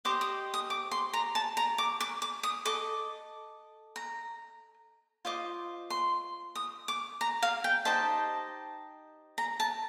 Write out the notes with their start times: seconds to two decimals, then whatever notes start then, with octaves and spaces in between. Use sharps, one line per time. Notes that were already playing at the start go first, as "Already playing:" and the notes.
0.05 G4 C5 D#5 D6
0.21 D#6
0.54 D#6
0.70 D6
0.91 C6
1.13 A#5
1.35 A5
1.57 A#5
1.78 D6
2.00 D6
2.22 D6
2.43 D#6
2.65 A4 D#5 D6
3.96 A#5
5.25 F4 C5 D#5 D6
5.90 C6
6.55 D#6
6.88 D6
7.21 A#5
7.43 F5
7.64 G5
7.85 D#4 G4 C5 D#5 A5
9.38 A#5
9.60 A5